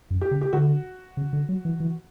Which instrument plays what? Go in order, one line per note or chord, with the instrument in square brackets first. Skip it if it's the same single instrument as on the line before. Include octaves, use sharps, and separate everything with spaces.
[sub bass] F#2
[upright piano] G4
[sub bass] C#3
[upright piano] G4
[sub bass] D3 [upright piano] F#4
[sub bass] C#3
D3
F#3
E3
E3